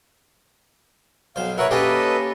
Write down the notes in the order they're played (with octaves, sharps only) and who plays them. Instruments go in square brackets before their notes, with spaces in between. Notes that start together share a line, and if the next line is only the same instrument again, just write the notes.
[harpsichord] B1 C5 [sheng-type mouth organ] F5
[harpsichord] E4 C#5 [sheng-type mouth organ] A#4 B4 F#5
[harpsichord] A#3 C#4 G4 [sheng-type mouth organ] A4 B4 D#5